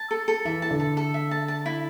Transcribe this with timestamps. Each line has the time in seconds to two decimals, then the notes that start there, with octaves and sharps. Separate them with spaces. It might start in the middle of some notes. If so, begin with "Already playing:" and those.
Already playing: A5
0.11 A4
0.28 A4
0.45 E3 E5
0.62 A5
0.71 D3
0.80 A4
0.97 A4
1.14 E5
1.31 A5
1.48 A5
1.66 E4